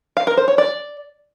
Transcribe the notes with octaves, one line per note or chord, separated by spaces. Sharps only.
F5
A#4
C5
C#5
D5